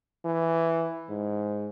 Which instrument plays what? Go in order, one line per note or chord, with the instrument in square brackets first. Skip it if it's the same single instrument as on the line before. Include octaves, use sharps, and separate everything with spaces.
[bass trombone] E3
G#2